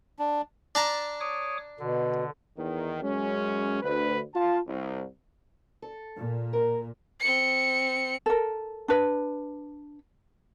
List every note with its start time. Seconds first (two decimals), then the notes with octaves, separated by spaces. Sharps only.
0.19 D4
0.75 D4 A5 A#5
1.20 C#5 D6 D#6
1.80 B2 D3
2.57 E2 D#3
3.02 F#2 G#3 C#4
3.83 D2 B4
4.34 F4 A5
4.68 C2
5.82 A4
6.18 A#2
6.53 A#4
7.20 C4 C#7
8.26 A4 A#4
8.88 D4 B4